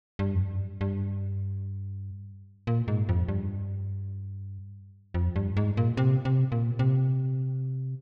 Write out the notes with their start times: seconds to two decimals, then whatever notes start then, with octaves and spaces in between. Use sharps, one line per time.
0.19 G2
0.35 F2
0.41 G2
0.81 G2
2.67 A#2
2.88 G#2
3.09 F2
3.28 G2
5.14 F2
5.36 G2
5.57 G#2
5.77 A#2
5.97 C3
6.25 C3
6.52 A#2
6.79 C3